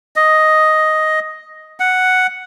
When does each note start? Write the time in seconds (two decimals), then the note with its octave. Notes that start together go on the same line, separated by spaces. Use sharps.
0.16 D#5
1.80 F#5